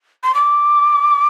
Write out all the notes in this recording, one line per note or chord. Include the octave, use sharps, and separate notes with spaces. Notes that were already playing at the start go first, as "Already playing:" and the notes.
C6
D6